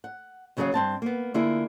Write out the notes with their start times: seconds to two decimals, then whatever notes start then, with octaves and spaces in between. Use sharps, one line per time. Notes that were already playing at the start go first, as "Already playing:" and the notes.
0.04 F#5
0.57 D#2 C#3 F#3 G#4 C#5 F5
0.74 G2 C4 A5
1.02 A#3 B3
1.34 D3 A#3 E4 F4 G#4